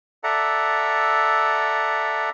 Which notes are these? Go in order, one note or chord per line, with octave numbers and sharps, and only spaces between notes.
A4 D5 E5 F#5 A#5